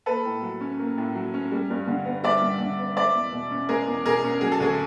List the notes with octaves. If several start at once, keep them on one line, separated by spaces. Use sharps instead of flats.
A#3 A4 B4
A2
F#3
C#4
A#3
A2
F#3
C#4
G3
G2
D3
B3
G3 D5 E5
G2
D3
B3
G#3 D5 E5
E2
B2
C#4
G#3 G#4 A#4
E2
B2 G#4 A#4
C#4
F#3 G#4
A4
D2 G#4